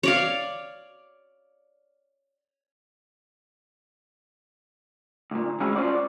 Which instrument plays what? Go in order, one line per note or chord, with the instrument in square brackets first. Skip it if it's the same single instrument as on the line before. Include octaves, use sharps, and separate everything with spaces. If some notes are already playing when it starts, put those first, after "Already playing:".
[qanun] C#5 D5 F5
[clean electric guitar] D2 A#2
D2 G#3 C#4 E4 F#4
C#4 F4 F#4 C5 D5